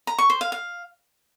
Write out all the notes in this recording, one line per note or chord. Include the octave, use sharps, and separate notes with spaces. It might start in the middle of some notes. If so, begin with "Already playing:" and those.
A#5
C#6
C5
F5
F5